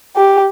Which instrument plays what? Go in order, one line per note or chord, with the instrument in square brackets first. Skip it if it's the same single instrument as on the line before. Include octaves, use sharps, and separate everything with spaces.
[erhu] G4